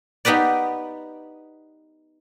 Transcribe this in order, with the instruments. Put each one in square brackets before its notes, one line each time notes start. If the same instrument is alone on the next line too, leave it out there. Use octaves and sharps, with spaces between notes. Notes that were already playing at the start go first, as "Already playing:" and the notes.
[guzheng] B3 D#4 G4 B4 D5